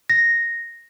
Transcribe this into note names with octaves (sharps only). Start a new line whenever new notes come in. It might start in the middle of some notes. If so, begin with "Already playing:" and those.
A#6